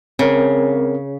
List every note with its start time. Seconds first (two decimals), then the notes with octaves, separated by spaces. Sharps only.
0.19 C#3 C4 A#4